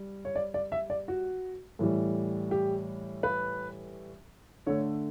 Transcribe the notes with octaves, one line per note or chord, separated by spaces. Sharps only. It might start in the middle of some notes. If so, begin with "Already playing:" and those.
Already playing: G3
C#5
D5
D5
E5
D5
F#4
A2 E3 G3
G4
B4
D3 A3 C#5